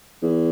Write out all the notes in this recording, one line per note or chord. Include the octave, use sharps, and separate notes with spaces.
E2